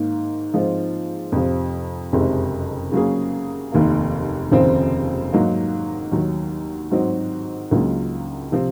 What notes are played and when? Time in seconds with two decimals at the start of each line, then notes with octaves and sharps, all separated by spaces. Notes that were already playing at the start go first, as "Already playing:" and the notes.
Already playing: G#2 D#3 A#3 D#4
0.53 G#2 F3 G#3 C4 F4
1.32 F2 C3 F3
2.13 F#1 F2 C3 D#3 G#3
2.92 C#3 F#3 A#3 C#4 G#4
3.72 F1 D#2 D#3 A#3
4.52 F1 D#2 C#3 F3 C4
5.32 G#2 F#3 A#3 D#4
6.12 D#2 D#3 F#3
6.91 G#2 F#3 C4 D#4 F#4
7.71 C#2 C#3 F#3 A#3 F4
8.52 C3 F3 C4